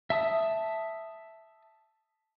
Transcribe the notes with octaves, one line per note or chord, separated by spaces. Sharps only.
E5 A5 D#6